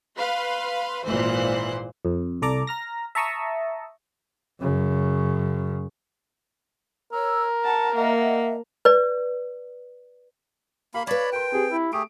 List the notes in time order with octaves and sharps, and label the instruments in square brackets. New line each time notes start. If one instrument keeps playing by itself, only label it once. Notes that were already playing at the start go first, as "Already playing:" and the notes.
[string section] B4 F5 B5 C6
G#1 A#2 E3 C5 C6 F#6
[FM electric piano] F2
C2 A4 D5 A#5 D6
A#5 F6 A#6
E5 A5 A#5 C#6 D#6 E6
[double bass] F#2 C#3
[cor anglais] A#4 [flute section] C#5 E6
[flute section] F#5 [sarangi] A5
[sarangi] A#3 [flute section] D#5 E5 F#5
[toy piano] B4 D5
[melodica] A#3 B5 [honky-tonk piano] F5
[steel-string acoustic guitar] B4 A5 [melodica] C#5 D5 B5
[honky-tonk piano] A#4 C6 [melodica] G5
[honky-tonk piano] C4 G4 [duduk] G#4
[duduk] E4
[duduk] A3 [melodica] G4 G#4 [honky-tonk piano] D7